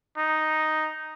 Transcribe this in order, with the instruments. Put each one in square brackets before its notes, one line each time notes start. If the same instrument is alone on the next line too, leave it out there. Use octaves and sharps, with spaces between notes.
[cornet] D#4